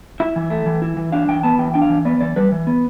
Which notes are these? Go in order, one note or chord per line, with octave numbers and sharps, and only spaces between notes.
E4 E5
E3
A3
E3
E4
E3
D4 F5
E3 G5
B3 A5
E3 G5
D4 G5
F5
E3
B3 D5
E3 D5
G3 B4
E3
B3